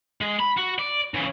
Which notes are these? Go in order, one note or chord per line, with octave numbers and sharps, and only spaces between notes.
G#3 G#4
B5
F#4
D5
C#3 E3